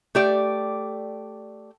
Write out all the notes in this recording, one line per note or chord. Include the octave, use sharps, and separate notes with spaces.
A3 G4 D5